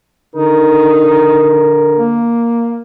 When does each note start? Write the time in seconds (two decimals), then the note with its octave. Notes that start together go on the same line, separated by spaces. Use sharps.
0.35 D3 D#4 A#4
1.97 A#3